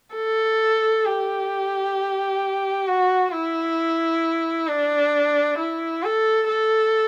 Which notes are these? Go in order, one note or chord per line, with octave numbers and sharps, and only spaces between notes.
A4
G4
F#4
E4
D4
E4
A4
A4